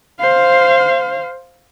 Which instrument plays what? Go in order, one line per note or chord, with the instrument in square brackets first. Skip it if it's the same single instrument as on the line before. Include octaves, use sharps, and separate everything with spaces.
[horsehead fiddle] C5 F5